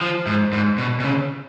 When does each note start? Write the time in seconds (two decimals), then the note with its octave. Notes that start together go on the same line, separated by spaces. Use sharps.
0.01 F3
0.27 G#2
0.53 G#2
0.78 B2
1.00 B2
1.04 C#3